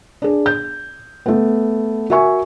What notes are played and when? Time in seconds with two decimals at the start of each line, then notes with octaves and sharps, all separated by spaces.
0.22 D4 G#4
0.46 G6
1.26 A3 B3
2.10 F#4 A#4 E5 G#5 C#6